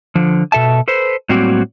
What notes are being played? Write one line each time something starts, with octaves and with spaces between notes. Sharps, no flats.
D3 F3
B2 A4 E5 A5
A4 B4 C5
A2 F#3 G3 A#3 C4 F#4